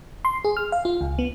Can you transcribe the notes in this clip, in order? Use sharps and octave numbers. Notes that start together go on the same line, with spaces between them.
C6
G#4
F6
F5
F4
C#2
B3